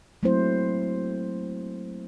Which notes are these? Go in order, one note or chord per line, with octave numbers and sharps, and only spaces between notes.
F#3 A3 A#3 C4 E4 C5